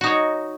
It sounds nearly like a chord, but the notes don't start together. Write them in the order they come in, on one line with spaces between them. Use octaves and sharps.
F#4 D#4 C#5